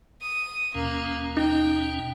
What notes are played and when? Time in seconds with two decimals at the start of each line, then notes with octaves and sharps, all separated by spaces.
0.21 D#6
0.75 D#2 B2 A#3 C#4
1.37 D#4 G5